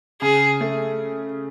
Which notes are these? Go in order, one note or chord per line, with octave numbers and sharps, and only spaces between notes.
C#3 G#4
A3